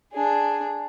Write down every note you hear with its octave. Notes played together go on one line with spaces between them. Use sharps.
D4 G#4